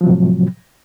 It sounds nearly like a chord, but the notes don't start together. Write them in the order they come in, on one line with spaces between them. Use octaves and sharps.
F3 F#3 C3 A2